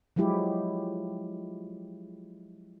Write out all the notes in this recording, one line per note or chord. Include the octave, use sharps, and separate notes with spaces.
F3 F#3 G#3 E4 G4